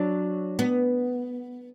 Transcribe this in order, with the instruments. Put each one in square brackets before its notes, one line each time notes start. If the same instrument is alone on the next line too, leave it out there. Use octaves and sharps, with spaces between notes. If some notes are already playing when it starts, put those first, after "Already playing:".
Already playing: [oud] F#3 [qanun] D4
[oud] B3